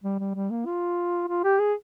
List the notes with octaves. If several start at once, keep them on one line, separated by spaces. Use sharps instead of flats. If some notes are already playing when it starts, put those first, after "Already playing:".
G3
G3
G3
A#3
F4
F4
G4
G#4